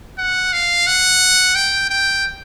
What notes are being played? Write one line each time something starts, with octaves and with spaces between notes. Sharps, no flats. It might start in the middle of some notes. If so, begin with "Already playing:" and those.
F#5
F5
F#5
G5
G5